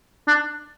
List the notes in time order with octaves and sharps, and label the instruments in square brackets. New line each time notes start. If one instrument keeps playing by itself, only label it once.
[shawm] D4